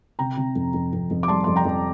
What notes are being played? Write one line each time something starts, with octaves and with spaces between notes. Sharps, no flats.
C3 G5 A#5
C3
F2
F2
F2
F2
D6
G3 A5 C6
F2 C6
G5 A#5
F2